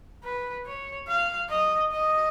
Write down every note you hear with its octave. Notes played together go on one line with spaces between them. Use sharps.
B4
C#5
F5
D#5
D#5